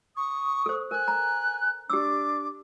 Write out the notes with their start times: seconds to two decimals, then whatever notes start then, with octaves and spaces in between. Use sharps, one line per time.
0.17 C#6 D#6
0.66 A4 C5
0.91 A#4 G#5 F#6
1.08 A#5
1.90 D4 G4 D6 E6